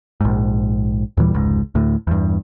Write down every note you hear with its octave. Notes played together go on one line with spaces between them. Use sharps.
A#1 G#2
D#2 A#2 E3 G3
F1 C#2 G#2
D2 A2
E2 G2